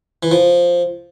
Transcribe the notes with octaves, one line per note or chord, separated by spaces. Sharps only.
E3
F3